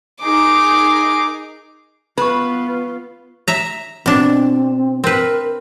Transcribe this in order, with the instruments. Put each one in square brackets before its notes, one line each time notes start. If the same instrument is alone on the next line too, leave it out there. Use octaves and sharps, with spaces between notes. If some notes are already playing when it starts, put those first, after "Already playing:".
[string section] D#4 G#4 A#4 [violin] D6
[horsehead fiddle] B3 F4 [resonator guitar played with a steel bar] B4 [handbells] B5 C#6
[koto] E5 A#5
[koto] B2 D4 [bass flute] C4
[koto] C4 B4 [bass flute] A#4